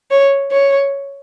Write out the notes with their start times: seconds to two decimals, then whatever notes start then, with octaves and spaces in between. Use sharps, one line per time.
0.11 C#5
0.51 C#5